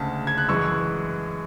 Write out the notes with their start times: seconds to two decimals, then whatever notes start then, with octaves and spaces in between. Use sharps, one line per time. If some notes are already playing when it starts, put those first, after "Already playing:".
Already playing: D2 C#3 G#3 A5
0.27 G#6
0.38 F#6
0.48 F#2 E3 G#3 C#6 E6